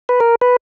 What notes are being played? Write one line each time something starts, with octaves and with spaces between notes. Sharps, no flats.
B4
A#4
B4